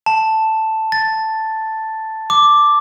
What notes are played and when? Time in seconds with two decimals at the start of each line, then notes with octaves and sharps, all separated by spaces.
0.06 A5
0.92 A6
2.30 D6